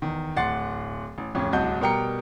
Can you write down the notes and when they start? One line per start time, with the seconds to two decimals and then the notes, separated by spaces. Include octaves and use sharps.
0.02 E2 D#3
0.36 D1 F#5 C6 A6 C7
1.18 A1
1.35 D1 F2 C#4 G5
1.53 D1 C2 F#4 D#5 A5 G6
1.81 B2 G3 A#4 G5 A#5 C#7